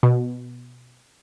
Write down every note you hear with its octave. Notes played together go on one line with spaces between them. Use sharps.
B2